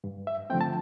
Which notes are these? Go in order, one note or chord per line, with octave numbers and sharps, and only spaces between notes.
G2
E5
D3 F3 A3 C4 G5
A5